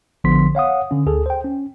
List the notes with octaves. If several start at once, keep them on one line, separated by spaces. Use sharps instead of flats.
A1 D3 F3 B3 C6 B6
C#5 F5 F#5 D#6
D3 C#4
D2 G#4 A4
C5 G5
C#4